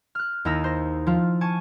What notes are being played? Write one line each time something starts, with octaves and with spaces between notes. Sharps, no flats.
F6 F#6
D#2 D#4 E4 A#5 E6 A#6
C5 A#6
F3 F4
G#5 A5 C#6